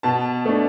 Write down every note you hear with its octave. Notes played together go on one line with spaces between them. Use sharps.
B2 A5
A3 D4